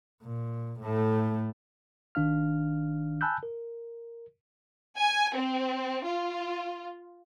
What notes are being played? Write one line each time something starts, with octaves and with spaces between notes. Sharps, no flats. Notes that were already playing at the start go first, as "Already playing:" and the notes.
A#2
A2 A3
G#1 D#3 D4 F5 F6
G#5 A5 B5 E6 F#6 G6
A#4
G#5
C4
F4